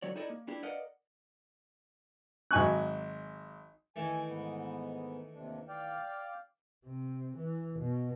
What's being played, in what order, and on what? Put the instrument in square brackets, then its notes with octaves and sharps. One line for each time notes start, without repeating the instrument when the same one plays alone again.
[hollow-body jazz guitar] D3 F#3 C#5 D5
D#4 E4 A4 D5 D#5
A#3
G3 D4 E4 G4
A#4 B4 D5 D#5 F5 F#5
[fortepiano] G#1 F#3 G#5 C#6 F#6
[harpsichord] D#3 E3 A3 [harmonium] G#5
[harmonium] G#2 B3
D#2 C3 D4
D5 F5 G5
[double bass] C3
E3
B2